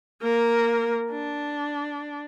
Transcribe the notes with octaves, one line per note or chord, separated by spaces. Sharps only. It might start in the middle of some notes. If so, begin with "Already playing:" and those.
A#3 A#4
D4